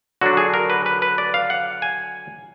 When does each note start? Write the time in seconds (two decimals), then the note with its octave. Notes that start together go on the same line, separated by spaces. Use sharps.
0.21 D3 F#3 D4 F#4
0.37 G#4
0.54 A#4
0.70 B4
0.86 B4
1.02 B4
1.18 D5
1.34 F5
1.50 F#5
1.82 G#5